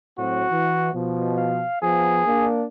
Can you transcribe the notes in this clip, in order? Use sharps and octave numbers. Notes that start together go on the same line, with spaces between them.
A2 F#3 C4 F#4
E3
B2 F3
F5
F3 B3 G#4
A#3 D4